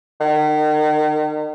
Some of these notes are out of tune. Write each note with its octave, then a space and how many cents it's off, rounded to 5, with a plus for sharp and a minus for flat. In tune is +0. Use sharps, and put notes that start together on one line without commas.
D#3 -35